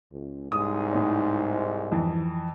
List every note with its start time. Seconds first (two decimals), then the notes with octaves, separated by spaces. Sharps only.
0.12 C#2
0.52 C2 G#2 D#6
0.93 A2 D#4
1.92 F2 E3